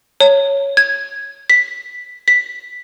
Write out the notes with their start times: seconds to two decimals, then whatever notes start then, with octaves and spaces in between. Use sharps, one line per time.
0.20 C#5
0.77 G#6
1.50 B6
2.28 B6